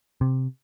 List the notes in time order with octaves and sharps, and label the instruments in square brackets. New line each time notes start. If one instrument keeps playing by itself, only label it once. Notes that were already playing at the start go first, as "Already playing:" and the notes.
[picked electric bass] C3